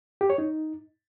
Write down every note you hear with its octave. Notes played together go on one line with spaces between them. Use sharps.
G4
C#5
D#4